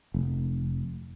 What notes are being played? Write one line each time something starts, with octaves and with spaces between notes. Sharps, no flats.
F1